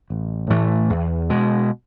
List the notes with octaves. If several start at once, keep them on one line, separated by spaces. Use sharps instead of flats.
A1
A2 E3 A3
E2
B2 G#3